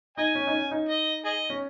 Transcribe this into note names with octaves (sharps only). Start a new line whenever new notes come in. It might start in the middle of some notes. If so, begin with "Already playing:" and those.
D#4 D#5 G#5
C#4
D#4
C#4
D#4
D#5
G#4 D#5
C#4